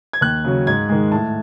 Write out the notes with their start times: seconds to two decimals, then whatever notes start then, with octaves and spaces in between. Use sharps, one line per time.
0.13 G#6
0.21 D#2 F#6
0.44 C#3 F#3 C#4
0.67 G#2 G#6
0.89 D#3 G#3
1.12 A2 A5